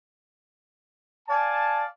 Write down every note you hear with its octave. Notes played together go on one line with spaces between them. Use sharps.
D5 F5 G#5 A5